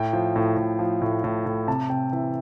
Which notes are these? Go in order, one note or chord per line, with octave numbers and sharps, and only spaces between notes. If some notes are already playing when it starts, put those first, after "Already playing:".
Already playing: A2 G5
F3
A2
A2
F3
A2
A2
A2
C3 A5
C3 G5
E3 E5